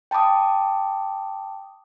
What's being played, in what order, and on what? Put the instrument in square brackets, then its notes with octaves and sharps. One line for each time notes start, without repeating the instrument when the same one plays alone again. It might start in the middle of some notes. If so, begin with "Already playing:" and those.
[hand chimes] G5 A5 B5 D6 D#6